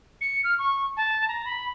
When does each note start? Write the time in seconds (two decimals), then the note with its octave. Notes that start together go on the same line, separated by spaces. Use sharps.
0.21 C#7
0.44 F6
0.58 C#6
0.97 A5
1.28 A#5
1.45 B5